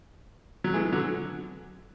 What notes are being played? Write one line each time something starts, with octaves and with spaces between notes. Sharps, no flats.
F#3
E3 G#3
D3 F#3